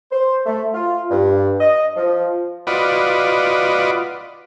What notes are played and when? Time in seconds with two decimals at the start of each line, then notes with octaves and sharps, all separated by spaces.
0.12 C5
0.46 A3
0.74 F4
1.10 G2
1.60 D#5
1.97 F3
2.67 F4 F#4 B4 D5 D#5